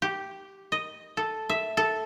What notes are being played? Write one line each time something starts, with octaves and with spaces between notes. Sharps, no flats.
G4
D#5
A4
E5
A4